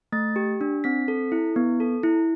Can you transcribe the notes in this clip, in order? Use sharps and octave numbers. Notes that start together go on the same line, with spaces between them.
A3 A6
G4
D4
C4 B6
A4
E4
B3
A4
E4